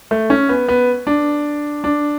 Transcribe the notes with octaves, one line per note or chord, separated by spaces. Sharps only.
A3
C#4
B3
B3
D4
D4